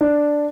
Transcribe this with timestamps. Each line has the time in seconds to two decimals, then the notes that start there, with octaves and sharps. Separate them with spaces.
0.01 D4